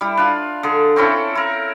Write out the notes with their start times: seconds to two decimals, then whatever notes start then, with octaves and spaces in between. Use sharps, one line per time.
0.01 G3 E4
0.17 D4 F4
0.63 D3 G#4
0.96 C4 C#4 E4 A4
1.35 E4 A#4